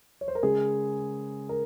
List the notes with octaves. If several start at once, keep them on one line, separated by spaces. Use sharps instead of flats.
C#5
C5
A#4
C#3 G#3 G#4
A#4